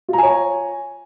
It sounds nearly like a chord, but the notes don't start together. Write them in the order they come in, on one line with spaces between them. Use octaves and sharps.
F4 A#5 G#5 C#5